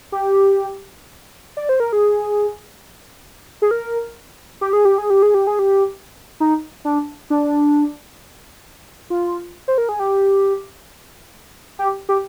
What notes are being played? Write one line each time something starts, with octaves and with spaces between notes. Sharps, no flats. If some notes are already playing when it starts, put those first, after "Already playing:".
G4
D5
C5
A#4
G#4
G#4
A#4
G4
G#4
G4
G#4
G4
G#4
G4
G#4
G4
D#4
D4
D4
F4
C5
A#4
G#4
G4
G4
G4